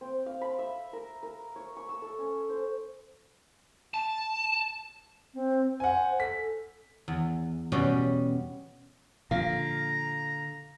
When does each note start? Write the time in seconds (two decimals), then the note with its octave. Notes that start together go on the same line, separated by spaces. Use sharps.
0.01 C4
0.26 F5
0.41 B5
0.59 E5
0.93 A#4
1.23 A#4
1.56 C#5
1.77 C#6
1.89 E6
2.02 A4
2.18 C#4
2.49 C5
3.94 A5
5.34 C4
5.80 C5 F#5 G#5
6.20 A4 B6
7.08 E2
7.72 B2 G3 C#4 F#4 G4
9.31 A#2 D3 F3 F5 A#5